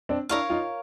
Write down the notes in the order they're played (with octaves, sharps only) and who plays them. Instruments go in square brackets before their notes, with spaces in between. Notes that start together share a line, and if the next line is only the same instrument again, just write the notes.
[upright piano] C4 D4
[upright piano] D4 E4 [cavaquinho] A#4 C#5 F5
[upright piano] D#4 F4